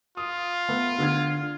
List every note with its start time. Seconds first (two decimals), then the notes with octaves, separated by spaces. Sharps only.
0.17 F4 D#6
0.69 A3 B3
0.98 D3 F6 G#6